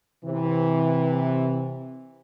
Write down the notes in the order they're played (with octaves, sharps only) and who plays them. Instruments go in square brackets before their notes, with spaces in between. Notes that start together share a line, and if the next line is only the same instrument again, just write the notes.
[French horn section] C3 E3